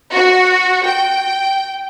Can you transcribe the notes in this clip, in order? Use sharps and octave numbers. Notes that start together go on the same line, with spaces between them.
F#4
G5